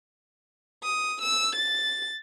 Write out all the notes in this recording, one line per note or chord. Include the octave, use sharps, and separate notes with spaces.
D#6
E6
A6